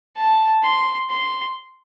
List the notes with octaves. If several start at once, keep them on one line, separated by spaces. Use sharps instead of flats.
A5
C6
C6